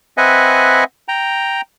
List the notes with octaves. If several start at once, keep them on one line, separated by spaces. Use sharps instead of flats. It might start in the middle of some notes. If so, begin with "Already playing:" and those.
C4 B4 D#5 E5 F#5 G#5
G5 A#5